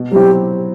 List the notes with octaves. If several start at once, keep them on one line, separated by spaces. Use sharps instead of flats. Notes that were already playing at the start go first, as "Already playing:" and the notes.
Already playing: B2
F#3 C4 E4 G4